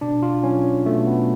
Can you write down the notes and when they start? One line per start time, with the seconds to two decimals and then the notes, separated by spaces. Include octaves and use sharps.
0.01 B2 D4
0.23 F4
0.44 F#3 C#4
0.86 B2 A3
1.07 B3